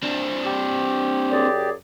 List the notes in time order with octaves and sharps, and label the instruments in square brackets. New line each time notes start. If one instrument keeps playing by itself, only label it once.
[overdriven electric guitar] C4 D4
[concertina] G4
[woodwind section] F#2 G#4 D5